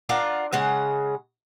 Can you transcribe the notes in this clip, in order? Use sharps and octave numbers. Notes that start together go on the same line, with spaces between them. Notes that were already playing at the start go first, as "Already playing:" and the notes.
D4 F4 A#4 F#5
C#3 G#3 F#5